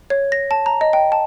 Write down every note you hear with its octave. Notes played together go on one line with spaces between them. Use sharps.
C#5
A#6
A5
A#5
D#5
G5
A5